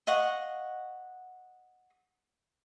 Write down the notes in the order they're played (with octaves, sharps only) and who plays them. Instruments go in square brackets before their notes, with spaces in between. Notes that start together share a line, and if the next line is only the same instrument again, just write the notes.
[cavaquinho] D#5 F5 F#5 C#6